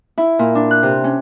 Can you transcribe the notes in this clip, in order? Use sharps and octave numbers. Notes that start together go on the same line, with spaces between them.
E4
A#2
D4
F#6
C3
C#4